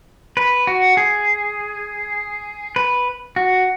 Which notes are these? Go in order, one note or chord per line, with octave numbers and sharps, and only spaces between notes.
B4
F#4
G#4
B4
F#4